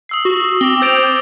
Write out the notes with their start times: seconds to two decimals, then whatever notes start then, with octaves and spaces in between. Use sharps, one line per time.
0.09 D#6 E6 C7
0.25 F#4
0.61 C4 D6 A#6 G7
0.82 C5 A6 D7 F7